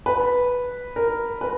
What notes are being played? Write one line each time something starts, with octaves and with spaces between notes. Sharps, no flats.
B4
A#4
B4